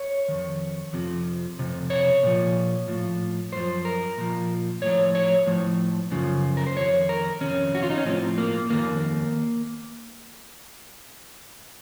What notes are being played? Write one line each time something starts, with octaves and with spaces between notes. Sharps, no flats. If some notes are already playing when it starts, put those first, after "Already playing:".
Already playing: C#5
F2 D#3
F2 C3 F3
F2 C3
C#5
A#2 F3
A2 F3
F#2 F3 C5
A#4
A#2 F3
A2 F3 C#5
C#5
A2 F3
F#2 C#3 F3
A#4
C5
F2 D#3 C#5
A#4
F2 C3 D#3 C#4
F#4
F4
D#4
C#4
A2 F3 C4
A#3
F2 D#3 A#3